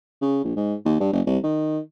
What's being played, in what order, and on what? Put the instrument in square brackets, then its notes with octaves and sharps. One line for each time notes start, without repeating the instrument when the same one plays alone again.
[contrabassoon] C#3
A#1
G#2
D#2
G2
F#1
C2
D#3